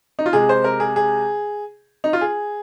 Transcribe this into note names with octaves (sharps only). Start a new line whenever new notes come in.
D#4
F4
C3 G#3 G#4
C5
A#4
G#4
G#4
D#4
F4
G#4